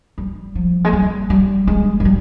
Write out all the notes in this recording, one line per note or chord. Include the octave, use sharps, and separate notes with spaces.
G3
F3
G#3
G3
G3
G#3
G#3
G3